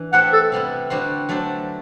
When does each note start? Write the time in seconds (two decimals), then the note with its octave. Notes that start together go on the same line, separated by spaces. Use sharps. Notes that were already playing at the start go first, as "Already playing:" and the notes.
Already playing: E3 D4
0.13 A3 E4 G4 C5 E5 F#5
0.33 A4
0.52 C3 G3 B3 E4
0.90 D3 G3 B3 F#4 C5
1.29 F#3 A3 D4 A4 C5